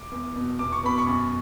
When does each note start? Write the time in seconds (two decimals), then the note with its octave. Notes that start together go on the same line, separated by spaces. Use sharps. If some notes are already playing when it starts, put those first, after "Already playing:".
Already playing: D6
0.11 E2
0.36 B2
0.59 E2 D6
0.72 C#6
0.83 B2 B5
0.98 C#6
1.07 F#2